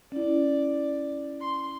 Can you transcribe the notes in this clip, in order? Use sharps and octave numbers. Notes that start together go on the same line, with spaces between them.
C#4 E4 D5
C6